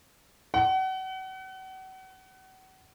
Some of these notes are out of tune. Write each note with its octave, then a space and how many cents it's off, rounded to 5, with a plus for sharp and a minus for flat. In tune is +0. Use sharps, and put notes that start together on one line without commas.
F#5 +35